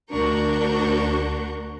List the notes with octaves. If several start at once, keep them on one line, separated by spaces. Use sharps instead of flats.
D2 D4 F#4 A#4 C#6 G6